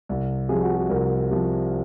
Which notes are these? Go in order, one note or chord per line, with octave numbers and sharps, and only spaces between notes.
C2
C3 F3 G#4
F#4
G#4
C2 A#4
C3 F3